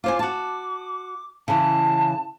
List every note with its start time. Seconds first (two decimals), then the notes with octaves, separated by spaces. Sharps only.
0.04 F4 C5 G#5 D6
0.19 F#4 A5 D6
1.48 C#3 E3 A5